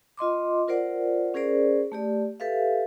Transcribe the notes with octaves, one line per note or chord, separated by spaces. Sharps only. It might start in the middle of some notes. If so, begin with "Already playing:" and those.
F4 D#5 C6 D6
F4 A#4 C5 D5 F#5
C#4 G#4 A#4 C5 D5
A3 G4 D5
G4 A4 B4 E5 F5